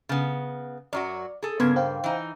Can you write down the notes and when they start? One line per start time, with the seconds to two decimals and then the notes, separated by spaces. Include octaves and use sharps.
0.09 C#3 B3
0.93 F#2 F#3 F#4 D5
1.43 G#4 A4
1.60 G2 C#3 A#3 B3 C6 G#6
1.76 C5 F5 G5
2.04 E3 D#4